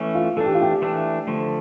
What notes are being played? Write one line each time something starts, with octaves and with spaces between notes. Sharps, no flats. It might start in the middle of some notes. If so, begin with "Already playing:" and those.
Already playing: E3 A3 C#4
F4
E3 A3 D4 A4
G4
F4
G4
E3 A3 D4
D3 F3 A3